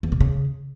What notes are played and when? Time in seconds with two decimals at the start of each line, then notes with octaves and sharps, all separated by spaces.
0.03 E2
0.12 B2
0.20 C#3